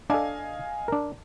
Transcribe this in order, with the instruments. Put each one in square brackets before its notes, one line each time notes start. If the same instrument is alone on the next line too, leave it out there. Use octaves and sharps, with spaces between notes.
[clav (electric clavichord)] D4 A4 [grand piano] D#5 F5 G#5
[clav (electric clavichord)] D4 A#4